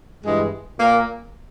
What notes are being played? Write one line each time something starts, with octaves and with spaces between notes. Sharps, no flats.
G2 E3 G#3
A#2 A#3